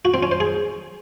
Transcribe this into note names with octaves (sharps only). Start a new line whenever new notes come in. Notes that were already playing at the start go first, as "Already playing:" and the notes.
F#4
C4
C#4
C5
G#4